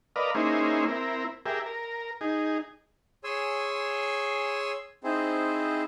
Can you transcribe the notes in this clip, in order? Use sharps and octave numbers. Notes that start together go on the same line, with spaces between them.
A#4 B4 D5 D#5 F5
A#3 C#4 D#4 E4 G#4 C5
C4 E4 A#4
G4 G#4 A#4 E5
A#4
D#4 G#4
G#4 C#5 G#5 C6 E6
C4 D#4 E4 G#4 C5